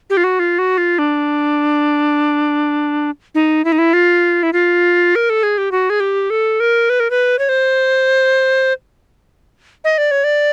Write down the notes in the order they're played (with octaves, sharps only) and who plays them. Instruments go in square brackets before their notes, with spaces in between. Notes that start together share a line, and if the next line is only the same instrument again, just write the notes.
[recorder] G4
F4
F#4
F4
F#4
F4
D4
D#4
E4
D#4
E4
F4
E4
F4
A#4
A4
G#4
G4
F#4
G#4
G4
A4
A#4
B4
A#4
B4
C#5
C5
D#5
D5
C#5
D5